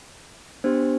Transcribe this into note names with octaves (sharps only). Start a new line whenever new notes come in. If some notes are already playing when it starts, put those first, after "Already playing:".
B3 D4 G4 C5